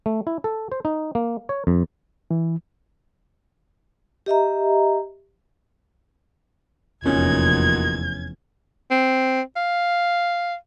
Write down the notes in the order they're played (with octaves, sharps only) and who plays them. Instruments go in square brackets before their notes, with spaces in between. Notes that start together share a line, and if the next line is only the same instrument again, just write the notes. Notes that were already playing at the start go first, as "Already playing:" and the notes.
[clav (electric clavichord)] A3
E4
A4
C5
D#4
A#3
C#5
F2
[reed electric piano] E3
[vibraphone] G4 D#5 E5 A#5
[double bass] F1 E2 [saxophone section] A#2 D#4 F#4 [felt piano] C#4 [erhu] G#6
[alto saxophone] C4
F5